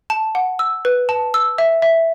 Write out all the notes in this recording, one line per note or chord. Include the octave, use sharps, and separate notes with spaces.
A5
F#5
E6
B4
A5
E6
E5
E5